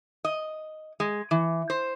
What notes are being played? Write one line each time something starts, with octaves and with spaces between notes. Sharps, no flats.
D#5
G#3
E3
C5